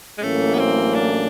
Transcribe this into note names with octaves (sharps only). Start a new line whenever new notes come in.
G#3
A1 A2 F#3 A3 A#3 C#4
B3
C4
D4